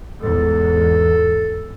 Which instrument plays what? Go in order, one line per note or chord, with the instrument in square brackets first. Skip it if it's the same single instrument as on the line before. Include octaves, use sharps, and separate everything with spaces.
[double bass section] E2 G#2 [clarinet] A4